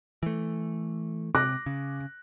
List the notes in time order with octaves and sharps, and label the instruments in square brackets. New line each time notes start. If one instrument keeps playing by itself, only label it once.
[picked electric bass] E3 A3
[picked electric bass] C3 [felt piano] D6 F#6 A#6
[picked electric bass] C#3